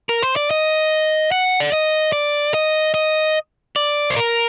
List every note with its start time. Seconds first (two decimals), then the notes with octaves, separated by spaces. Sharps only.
0.09 A#4
0.23 C5
0.36 D5
0.51 D#5
1.32 F#5
1.60 D5
1.72 D#5
2.13 D5
2.54 D#5
2.94 D#5
3.76 D5
4.10 C5
4.16 A#4